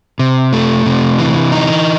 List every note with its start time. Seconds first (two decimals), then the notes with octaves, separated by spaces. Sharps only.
0.19 C3
0.53 A3
0.86 C3
1.19 E3
1.52 D#4